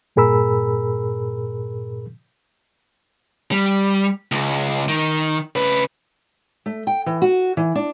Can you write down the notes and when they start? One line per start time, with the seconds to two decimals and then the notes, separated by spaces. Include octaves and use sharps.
0.16 G2 A#2 G#4 A#4 B5 E6
3.52 G3
4.32 C#2
4.89 D#3
5.56 C#3 B4
6.66 A3
6.87 G5
7.06 E3
7.22 F#4
7.57 E3
7.75 D4